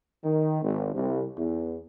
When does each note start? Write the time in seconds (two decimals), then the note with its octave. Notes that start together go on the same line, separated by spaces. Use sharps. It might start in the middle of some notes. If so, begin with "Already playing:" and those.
0.24 D#3
0.62 G#1
0.94 C2
1.38 E2